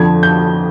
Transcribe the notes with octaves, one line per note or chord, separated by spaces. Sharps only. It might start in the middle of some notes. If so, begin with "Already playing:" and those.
Already playing: F2 D3 F3 G#6
G6